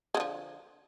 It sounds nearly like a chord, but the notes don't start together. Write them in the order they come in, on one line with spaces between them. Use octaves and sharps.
G#3 D3 F3